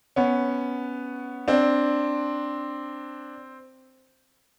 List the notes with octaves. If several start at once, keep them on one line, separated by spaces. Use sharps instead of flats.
B3 C#4
C4 D4